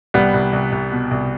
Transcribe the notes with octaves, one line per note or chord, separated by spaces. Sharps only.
C2 G3 B3
C2
C2
C2
B2
C2